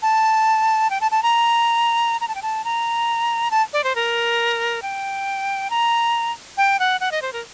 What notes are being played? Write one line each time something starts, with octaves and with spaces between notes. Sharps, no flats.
A5
G5
A5
A5
A#5
A#5
A5
G5
A5
A#5
A5
D5
C5
A#4
G5
A#5
G5
F#5
F#5
D#5
C5
A#4